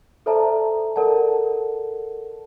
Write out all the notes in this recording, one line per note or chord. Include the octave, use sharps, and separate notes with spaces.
A4 C5 D5 E5 A5 A#5
A4 A#4 D5 F#5 A5